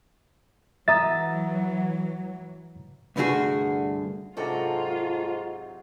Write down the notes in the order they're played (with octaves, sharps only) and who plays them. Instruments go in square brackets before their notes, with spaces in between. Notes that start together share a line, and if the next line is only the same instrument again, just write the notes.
[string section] E3 F#3 [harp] E5 D#6 [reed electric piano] A#5 A6
[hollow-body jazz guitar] C2 G2 D3 A3 F#4 G#4
[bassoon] G#2 [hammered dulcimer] C3 F#3 A#5 [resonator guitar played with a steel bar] C#4 D4 A4 [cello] F4